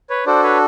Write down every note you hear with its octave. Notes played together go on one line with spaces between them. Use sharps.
B4 C#5
D4 F#4 A4 C5 D5
B4 C#5